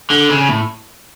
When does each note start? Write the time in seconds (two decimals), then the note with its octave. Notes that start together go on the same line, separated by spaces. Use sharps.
0.11 D3
0.30 C#3
0.50 A2